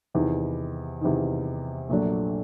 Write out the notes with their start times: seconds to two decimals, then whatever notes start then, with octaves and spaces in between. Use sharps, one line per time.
0.14 E2 C3 D#3
1.01 E2 C3 D#3
1.89 A#1 A#2 F#3 A3 D4